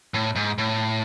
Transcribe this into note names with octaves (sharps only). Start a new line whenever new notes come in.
A2
G#2
A2